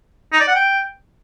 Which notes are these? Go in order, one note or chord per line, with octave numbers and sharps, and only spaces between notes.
D#4
D5
F#5
G5